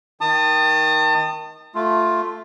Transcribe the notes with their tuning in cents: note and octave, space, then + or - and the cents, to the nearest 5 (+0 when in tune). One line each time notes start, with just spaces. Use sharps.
D#3 +15 A5 +30 D#6 -20
A3 +0 F4 +5